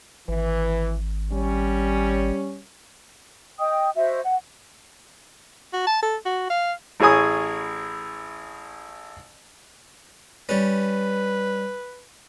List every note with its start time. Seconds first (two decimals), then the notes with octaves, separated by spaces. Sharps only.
0.28 G#1 E3
1.32 G3 C#4
3.59 D#5 G5 D#6
3.95 F#4 C5 D#5 E5
4.24 F#5
5.73 F#4
5.87 A5
6.03 A4
6.25 F#4
6.50 F5
7.00 A1 E4 G#4 C#5 G#5 D#6
10.49 G3 C#4 B4